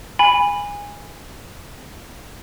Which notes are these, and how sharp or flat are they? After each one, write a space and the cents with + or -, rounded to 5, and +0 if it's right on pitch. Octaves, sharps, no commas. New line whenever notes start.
G#5 -20 B5 +0